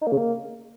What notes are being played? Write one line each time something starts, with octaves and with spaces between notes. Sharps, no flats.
D#4
A#3
C#3
A#3